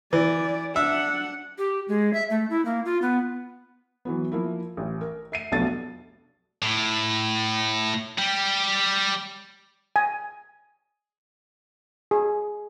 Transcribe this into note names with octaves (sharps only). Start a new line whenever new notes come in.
E3 D5
D4 E5 F#5
G4
G#3
E5
A3
E4
A#3
F4
B3
E3 F#3 B3
F3 A#3 E4
A1
A#4
E5 C7 D#7
F1 B1 B2 A3 D4 A6
A2
G3 G4
G#5
G#4